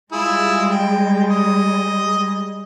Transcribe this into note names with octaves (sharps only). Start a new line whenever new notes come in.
G3 G#3 E4 F4 G#4
G5
D#5